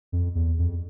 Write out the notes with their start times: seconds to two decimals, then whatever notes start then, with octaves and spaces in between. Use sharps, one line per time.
0.12 F2
0.35 E2
0.59 F2